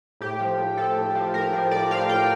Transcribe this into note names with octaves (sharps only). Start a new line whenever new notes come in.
A2 G4
F3
A2
F3 A4
A2
F3
A2 A#4
F3
A2 D5
F3 F5
A2 G5